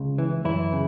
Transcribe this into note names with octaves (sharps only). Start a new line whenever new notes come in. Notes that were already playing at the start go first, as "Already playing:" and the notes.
Already playing: C#2 C#3
E3
F#2 E3 E4
C#3